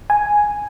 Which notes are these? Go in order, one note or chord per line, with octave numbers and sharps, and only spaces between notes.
G#5